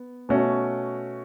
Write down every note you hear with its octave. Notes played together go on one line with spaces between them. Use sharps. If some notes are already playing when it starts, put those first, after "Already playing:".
Already playing: B3
B2 A3 C#4 F#4